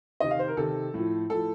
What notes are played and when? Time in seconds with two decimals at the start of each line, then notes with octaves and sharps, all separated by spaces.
0.20 C3 D#3 D#5
0.31 F5
0.39 C5
0.48 A#4
0.57 C3 D#3 A4
0.94 A2 F3
1.30 A2 F3 A4